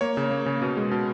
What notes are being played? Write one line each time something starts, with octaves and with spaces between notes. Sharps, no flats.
A#3 C#5
C#3
A#3
C#3
B2
G#3
B2